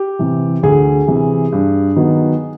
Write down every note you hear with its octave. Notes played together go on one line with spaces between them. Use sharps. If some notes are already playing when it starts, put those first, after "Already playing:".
Already playing: G4
C3 E3
D2 G#4
C3 E3
G2
D#3 F#3 B3